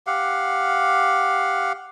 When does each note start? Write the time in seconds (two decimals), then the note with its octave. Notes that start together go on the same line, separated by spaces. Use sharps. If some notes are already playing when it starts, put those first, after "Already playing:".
0.07 G4 F5 F#5